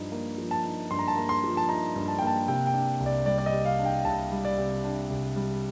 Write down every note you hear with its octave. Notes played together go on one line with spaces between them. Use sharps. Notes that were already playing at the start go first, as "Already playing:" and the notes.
Already playing: G2 F3 D#4
A#3
F3
A5
D#4
G2 C6
A#5
A5
A#3 A#5
C6
F3
A5
D#4 A#5
G2
A5
A#3 G5
A5
C3 G5
G5
D4
C2
D5
G3 D5
D5
D#5
C3
F5
D4
G5
C2 A5
G3
D5
C3
D4
C2
G3